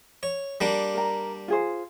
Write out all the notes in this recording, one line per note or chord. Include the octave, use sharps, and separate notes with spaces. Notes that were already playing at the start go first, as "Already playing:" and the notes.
C#5
G3 A#3 D4
A#4 A#5
F4 G#4 C5